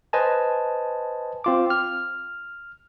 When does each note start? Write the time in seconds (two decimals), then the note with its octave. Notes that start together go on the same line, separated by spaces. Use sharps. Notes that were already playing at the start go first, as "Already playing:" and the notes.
0.13 B4 C5 D#5 G#5 A5
1.44 C4 F4 D6
1.70 F6